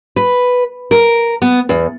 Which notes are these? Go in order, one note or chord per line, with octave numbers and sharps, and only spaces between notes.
B4
A#4
B3
E2